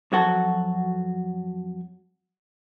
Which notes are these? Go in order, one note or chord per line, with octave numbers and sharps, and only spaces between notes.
F2 F#3 F#4 A4